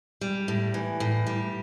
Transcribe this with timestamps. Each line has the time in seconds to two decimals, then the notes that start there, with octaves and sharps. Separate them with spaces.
0.21 G3
0.48 A2
0.74 E3
1.00 A2
1.27 G3